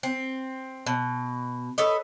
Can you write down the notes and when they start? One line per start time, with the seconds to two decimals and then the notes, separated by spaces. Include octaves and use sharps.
0.03 C4
0.86 B2
1.78 A4 B4 C#5 D#5